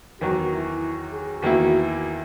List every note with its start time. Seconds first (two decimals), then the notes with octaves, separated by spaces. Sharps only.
0.20 E2 D#3 F#3 F#4
0.51 E4
1.12 G#4
1.42 E2 D#3 A#3 E4 F#4